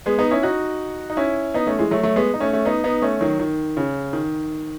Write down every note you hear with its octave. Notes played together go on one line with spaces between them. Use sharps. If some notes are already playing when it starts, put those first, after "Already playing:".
G#3 B3
B3 D#4
C#4 E4
D#4 F#4
D#4
C#4 E4
B3 D#4
A3 C#4
E3 G#3
F#3 A3
F#3 A3
G#3 B3
D#4
A3 C#4
A3 C#4
B3 D#4
B3 D#4
A3 C#4
D#3 F#3
D#3
C#3
D#3